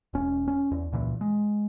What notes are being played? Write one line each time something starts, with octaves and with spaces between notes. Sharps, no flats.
E1 C#4
C#4
E2
C#2 A#2 E3
G#3